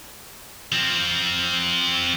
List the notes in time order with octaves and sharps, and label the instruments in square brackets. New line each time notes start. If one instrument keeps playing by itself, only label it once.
[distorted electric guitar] F3 C4